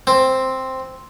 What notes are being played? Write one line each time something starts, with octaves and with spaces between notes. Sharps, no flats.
C4